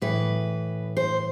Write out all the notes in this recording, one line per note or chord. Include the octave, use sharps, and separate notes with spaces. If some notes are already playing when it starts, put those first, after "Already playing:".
A2 E3 B4
C5